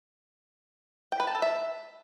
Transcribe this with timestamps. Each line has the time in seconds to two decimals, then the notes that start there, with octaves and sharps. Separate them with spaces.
1.12 G5
1.20 B4
1.27 A5
1.35 A4
1.42 E5